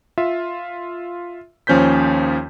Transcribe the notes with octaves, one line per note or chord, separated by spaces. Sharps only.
F4 E5
D#2 F3 C#4 C5 G6 B6